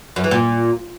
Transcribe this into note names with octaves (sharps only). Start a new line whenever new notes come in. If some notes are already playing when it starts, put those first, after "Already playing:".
F#2
E3
A#2